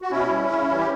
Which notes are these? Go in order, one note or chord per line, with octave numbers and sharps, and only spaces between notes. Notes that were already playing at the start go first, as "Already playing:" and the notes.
F#4
B2 C#4 E4
G3
C#3
E3 G3
G4